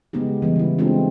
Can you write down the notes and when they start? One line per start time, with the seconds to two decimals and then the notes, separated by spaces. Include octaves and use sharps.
0.13 C#3 G#3 B3 D#4 G4
0.42 E3 G3 B3
0.56 C#3 E4
0.78 G#3 C4 D4 D#4 F4 A4